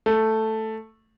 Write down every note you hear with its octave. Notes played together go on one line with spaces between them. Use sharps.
A3